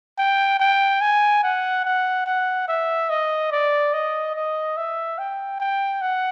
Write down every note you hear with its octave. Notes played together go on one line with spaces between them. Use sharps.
G5
G5
G#5
F#5
F#5
F#5
E5
D#5
D5
D#5
D#5
E5
G5
G5
F#5